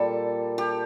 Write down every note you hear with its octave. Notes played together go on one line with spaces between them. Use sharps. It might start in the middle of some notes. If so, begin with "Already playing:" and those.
Already playing: A#2 G3 A4
G4